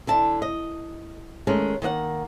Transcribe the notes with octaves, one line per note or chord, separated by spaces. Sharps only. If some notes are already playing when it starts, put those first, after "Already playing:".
D3 E4 A5
D#5
D#3 G#3 A3 C#4
D#3 A#3 D#5 F#5